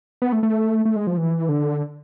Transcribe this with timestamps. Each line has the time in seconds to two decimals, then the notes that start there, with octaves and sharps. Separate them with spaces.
0.22 B3
0.32 A3
0.43 A3
0.85 A3
0.96 G#3
1.07 F3
1.17 E3
1.49 D3